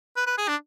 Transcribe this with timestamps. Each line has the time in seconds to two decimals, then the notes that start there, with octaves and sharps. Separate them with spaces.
0.17 B4
0.27 B4
0.38 G#4
0.48 D4